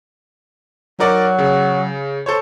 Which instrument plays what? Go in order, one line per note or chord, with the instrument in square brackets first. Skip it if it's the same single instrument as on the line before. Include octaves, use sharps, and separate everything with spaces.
[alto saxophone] F#3 [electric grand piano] D#4 A#4 D5
[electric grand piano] C#3
A4 C5 C#5